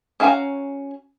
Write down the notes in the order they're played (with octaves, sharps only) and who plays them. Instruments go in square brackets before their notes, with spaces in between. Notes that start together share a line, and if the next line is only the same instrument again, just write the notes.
[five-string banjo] C#4 F#4 F5 G#5 A#5